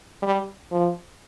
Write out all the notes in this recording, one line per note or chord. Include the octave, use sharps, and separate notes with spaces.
G3
F3